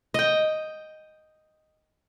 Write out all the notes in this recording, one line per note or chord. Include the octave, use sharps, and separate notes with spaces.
D#5 G5